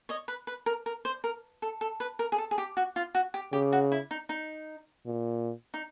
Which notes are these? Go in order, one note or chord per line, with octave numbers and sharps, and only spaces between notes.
C#5 D#5
B4
B4
A#4
A#4
C5
A#4
A4
A4
B4
A#4
G#4
A4
G#4
G4
F#4
F4
F#4
G4
C#3 G4
F#4
E4
D#4
D#4
A#2
D#4